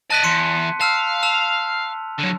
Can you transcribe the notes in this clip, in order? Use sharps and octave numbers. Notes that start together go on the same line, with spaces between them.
D5 D#5 A5 F#6 B6
E2 C6 C#7 D#7
F5 A5 E6 F6
A5 E6 F7
D3 F#3